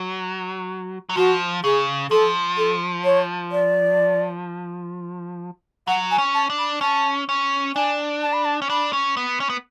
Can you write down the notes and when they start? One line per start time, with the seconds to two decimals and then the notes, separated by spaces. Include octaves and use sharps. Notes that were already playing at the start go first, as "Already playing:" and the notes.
Already playing: F#3
1.09 F#3
1.16 F3 F#4
1.64 C#3 G#4
2.11 F3 A4
2.58 A4
3.05 C#5
3.52 D5
5.87 F#3 F#5
6.11 G#5
6.18 C#4
6.34 A5
6.50 D4
6.58 B5
6.81 C#4 A5
7.29 C#4
7.75 D4 G#5
8.22 A5
8.33 B5
8.45 A5
8.62 C#4
8.70 D4 B5
8.93 C#4
9.17 B3
9.40 C#4
9.50 B3